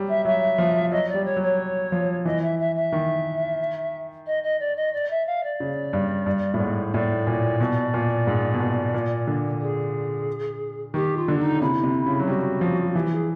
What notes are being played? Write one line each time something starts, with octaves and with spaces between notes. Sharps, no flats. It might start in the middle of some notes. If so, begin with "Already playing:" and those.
Already playing: F#3 G3
E5
F#3 E5
F3
F#3 D#5
D5
G3
C#5
F#3
C#5
F3
E3 D#5
E5
E5
E5
D#3
D#5
D#5
D5
D#5
D5
E5
F5
D5
C#3
G2
G2
A2
G#2
A2 D5
A#2
B2
A#2
G#2
B2
A#2
A#2
D3
G#4
D#3 G4
F4
D3
D#4
C#3
C3 E4
C3
C#3
F#3
G3 F#4
F3
E3 G4
G#4